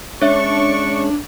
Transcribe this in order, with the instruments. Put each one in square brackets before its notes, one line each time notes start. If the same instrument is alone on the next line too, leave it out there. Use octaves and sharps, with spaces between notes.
[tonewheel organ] G#3 C#4 [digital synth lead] D4 [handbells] C#5 E5 [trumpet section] D5 C#6